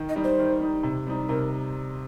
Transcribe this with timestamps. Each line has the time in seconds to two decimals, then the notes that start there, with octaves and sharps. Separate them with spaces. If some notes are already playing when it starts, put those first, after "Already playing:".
Already playing: D#3
0.09 D#5
0.16 G3 D#4
0.24 C5
0.39 D#3
0.61 G3 D#4
0.83 C3
1.07 G3 C4 D#4
1.28 C3 A#4